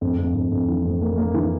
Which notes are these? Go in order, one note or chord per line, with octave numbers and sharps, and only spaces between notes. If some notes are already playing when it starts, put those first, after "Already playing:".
F2
F2
F2
F2
E3
F2
A#3
A#3
E3